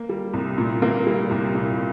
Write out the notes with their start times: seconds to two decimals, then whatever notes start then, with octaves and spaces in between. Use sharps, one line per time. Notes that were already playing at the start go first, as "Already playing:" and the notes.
Already playing: A#3
0.09 G3
0.33 C2
0.58 A#2
0.82 A#3
1.07 G3
1.31 C2
1.55 A#2